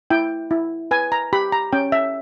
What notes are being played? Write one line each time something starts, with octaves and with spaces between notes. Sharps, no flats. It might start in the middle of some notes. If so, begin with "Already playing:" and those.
E4 G5
E4
B4 G#5
A#5
G4 B5
A#5
C#4 G5
E5